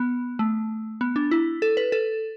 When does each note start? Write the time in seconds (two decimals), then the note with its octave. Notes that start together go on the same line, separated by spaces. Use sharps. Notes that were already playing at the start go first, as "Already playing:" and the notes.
Already playing: B3
0.39 A3
1.01 B3
1.16 D4
1.31 E4
1.62 A4
1.77 B4
1.92 A4